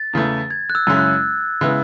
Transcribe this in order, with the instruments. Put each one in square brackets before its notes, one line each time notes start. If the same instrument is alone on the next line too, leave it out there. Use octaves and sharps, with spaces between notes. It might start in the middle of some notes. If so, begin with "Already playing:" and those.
Already playing: [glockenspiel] A6
[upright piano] E2 C#3 E3 A3
[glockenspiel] G#6
F#6
E6
[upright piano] F#2 C#3 G#3 C#4 E4 [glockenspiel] E6
[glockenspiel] F#6
[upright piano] C#3 G#3 B3 E4